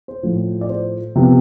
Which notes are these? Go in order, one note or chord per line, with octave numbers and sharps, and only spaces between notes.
C5
A2 F3 A3
D5
C5
C3 F3 B3